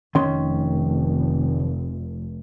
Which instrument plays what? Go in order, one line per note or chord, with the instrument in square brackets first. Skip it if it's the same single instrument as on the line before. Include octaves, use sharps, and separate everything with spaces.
[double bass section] F1 [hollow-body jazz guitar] D#3 C#4 C6